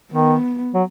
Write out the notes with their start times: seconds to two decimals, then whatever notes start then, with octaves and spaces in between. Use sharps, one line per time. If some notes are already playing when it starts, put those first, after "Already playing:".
0.13 D#3 B3
0.74 F#3